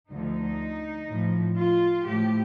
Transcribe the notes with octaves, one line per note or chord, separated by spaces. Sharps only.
D2 D3 F3 D#4
A2 F3
F4
A2 F3 G4